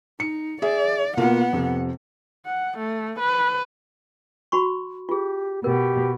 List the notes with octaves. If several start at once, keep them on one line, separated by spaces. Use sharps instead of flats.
D#4 C#7
G#4 D5 E5
B2 A#3 B3 F4 F#5
F2 C3
F#5
A3
B4
F#4 B5 C#6
F4 G4 G#4
B2 G4 A#4